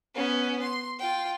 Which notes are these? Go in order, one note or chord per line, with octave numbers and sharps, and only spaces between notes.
B3 C#4
C6
F4 G5